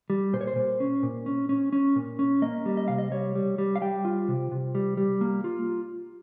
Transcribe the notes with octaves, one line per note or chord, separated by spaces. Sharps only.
G3
A#2 C5
C#5
C5
A#2
C#4
A#2
C#4
C#4
C#4
A#2
C#4
A#3 D#5
G3
D#5
C3 F5
D#5
G3 C#5
G3
G3
F5
G3 G5
F4
C3
C3
G3
G3
A#3
F4